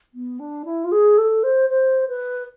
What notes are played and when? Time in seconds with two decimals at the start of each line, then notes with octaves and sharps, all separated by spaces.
0.14 B3
0.39 D4
0.65 E4
0.84 F4
0.91 G#4
1.18 A4
1.43 C5
1.69 C5
2.08 B4